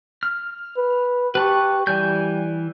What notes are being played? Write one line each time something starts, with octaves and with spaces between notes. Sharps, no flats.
F6
B4
G4 B4 A5 C#6
E3 G3 G#5 G6